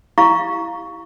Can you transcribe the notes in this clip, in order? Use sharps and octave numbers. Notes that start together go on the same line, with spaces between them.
E4 G4 F5 A#5 C#6